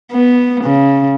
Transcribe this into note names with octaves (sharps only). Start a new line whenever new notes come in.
B3
C#3